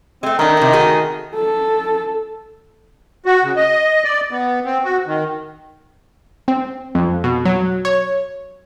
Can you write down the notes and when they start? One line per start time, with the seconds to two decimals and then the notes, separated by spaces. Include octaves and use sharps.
0.23 G#3 A3 C4
0.39 D#3 A3 D4
0.57 C3 D#4
0.73 A3 F#4 G#4
1.35 A4
3.26 F#4
3.43 C#3
3.56 D#5
4.04 D5
4.31 B3
4.65 C4
4.84 F#4
5.06 D#3
6.48 C4
6.95 F2
7.24 B2
7.45 F#3
7.85 C#5